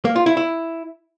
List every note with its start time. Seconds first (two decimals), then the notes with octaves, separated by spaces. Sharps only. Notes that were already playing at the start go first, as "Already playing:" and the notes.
0.05 A#3
0.16 F4
0.26 E4
0.37 E4